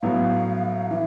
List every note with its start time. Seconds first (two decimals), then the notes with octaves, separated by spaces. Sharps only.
0.02 A2 F#3 B3 F5
0.90 E3 E5